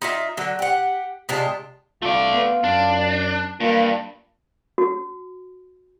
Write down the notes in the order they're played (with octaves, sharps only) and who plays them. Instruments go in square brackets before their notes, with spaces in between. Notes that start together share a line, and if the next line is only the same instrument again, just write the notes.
[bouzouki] D#4 F4 E5
D3 F#3
G4 F#5
C3 G#3 D4 F4
[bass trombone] C2 [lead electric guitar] A3 D5 [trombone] F4
[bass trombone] B3
[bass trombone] F#2 [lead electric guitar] D4
[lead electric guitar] G2 [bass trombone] A#3 [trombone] F4
[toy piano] F#4